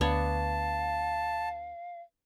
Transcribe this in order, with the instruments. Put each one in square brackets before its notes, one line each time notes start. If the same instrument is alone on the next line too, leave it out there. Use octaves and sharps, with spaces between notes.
[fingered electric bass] D2 [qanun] B3 D4 C#5 [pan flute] F5 [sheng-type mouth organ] A5